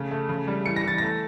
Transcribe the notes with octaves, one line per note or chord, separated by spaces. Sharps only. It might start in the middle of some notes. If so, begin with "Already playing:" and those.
Already playing: C#3 A3
A3
C#3
G3
E3 C#7
A#6
E3 A6
A3 A#6